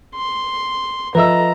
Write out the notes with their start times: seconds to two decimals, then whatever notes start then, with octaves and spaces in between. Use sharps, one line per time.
0.15 C6
1.15 F3 A4 B4 D#5 E5 A#5 E6